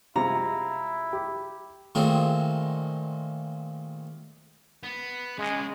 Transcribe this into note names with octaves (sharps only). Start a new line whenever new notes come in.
C3 G#3 E4 F4 A#5
G4
A#2 D#3 G#3 A3 C4
B3
C#3 G#3